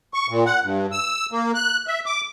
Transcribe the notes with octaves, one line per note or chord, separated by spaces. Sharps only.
C#6
A#2
F#5
G2
E6
A#3
F#6
E5
D6